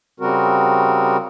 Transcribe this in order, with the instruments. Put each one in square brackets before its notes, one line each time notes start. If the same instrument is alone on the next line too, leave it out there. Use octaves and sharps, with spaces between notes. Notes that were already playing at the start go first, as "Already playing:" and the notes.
[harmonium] C#3 G3 C4 F#4 A#4